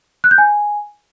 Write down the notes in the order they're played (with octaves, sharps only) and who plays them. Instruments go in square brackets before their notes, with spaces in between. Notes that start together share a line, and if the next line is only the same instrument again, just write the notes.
[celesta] F#6
G6
G#5